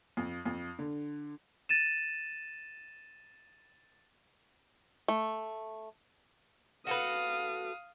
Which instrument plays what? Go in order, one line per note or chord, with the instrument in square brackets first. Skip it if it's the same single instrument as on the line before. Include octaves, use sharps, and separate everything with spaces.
[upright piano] F2
F2
D3
[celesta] A6 D#7 E7
[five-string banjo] A3
[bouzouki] F#4 A4 B4 [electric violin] F5 D#6